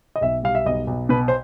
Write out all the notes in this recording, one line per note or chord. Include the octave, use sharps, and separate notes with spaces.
D#5
B1 E5
G3 F5
E5
B1 D#5
B1
B2 B4
C5